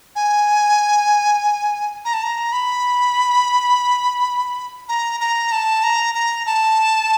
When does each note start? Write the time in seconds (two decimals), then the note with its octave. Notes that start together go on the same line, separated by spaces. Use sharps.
0.16 G#5
2.05 A#5
2.14 A5
2.23 A#5
2.53 B5
4.89 A#5
5.20 A#5
5.52 A5
5.84 A#5
6.15 A#5
6.46 A5